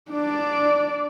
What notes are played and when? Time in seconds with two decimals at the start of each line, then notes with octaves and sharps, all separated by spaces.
0.11 D4 D5